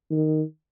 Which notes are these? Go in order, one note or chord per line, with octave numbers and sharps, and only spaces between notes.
D#3